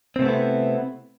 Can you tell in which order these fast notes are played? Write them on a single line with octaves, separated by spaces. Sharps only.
C4 C3 A3 B3 E4